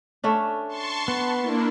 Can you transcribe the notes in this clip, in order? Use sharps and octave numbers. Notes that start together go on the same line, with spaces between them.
A3 C#4 D4
A5 C6 C#6
B3
A#3 D4 E4